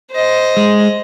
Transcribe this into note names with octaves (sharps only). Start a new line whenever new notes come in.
C5 D#5
G#3